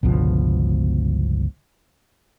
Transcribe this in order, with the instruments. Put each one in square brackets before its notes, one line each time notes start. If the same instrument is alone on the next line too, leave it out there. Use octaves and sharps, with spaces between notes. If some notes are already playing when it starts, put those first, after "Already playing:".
[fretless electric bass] G1 C#2 B2 F3